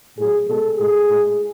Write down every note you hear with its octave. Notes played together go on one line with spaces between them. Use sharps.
A2 F#3 G#4
B2 G#3 A4
A2 G#3 G#4
A2 G#3